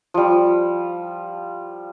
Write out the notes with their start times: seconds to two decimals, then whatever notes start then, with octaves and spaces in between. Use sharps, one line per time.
0.14 F3 G3